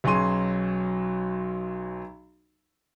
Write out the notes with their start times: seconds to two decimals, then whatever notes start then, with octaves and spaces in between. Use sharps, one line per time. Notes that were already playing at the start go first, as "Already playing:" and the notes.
0.04 B1 F#3 C#4 G#4 C6 D#7